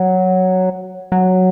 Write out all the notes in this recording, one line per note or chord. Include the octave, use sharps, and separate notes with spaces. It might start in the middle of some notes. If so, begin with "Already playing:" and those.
Already playing: F#3
F#3